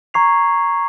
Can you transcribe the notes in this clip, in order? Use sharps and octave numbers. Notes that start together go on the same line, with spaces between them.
A#5 C#6 G#6 C7 F7